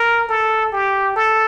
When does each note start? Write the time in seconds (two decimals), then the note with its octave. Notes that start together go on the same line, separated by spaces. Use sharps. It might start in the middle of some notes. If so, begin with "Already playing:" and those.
Already playing: A#4
0.29 A4
0.72 G4
1.16 A4